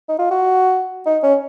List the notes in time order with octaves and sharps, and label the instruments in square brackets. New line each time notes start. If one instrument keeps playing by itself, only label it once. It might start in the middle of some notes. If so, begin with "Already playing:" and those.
[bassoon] D#4
F4
F#4
D#4
C#4